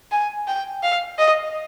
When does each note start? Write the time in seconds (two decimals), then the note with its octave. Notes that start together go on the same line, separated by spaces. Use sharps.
0.11 G#5
0.48 G5
0.83 F5
1.18 D#5